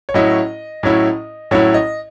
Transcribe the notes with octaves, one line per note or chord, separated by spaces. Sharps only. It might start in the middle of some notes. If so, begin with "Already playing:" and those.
C#5
A2 F#3 C#4 E4 D#5
A2 F#3 C#4 E4
A2 F#3 C#4 E4 C#5
D#5